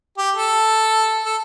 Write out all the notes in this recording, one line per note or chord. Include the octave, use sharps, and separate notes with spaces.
G4
A4
A4